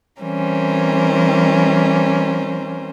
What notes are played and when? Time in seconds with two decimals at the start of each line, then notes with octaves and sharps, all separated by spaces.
0.21 E3 G3 C4 C#4 A#4 C5